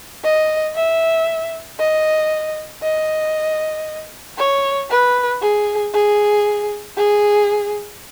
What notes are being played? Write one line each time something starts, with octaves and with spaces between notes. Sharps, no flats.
D#5
E5
D#5
D#5
C#5
B4
G#4
G#4
G#4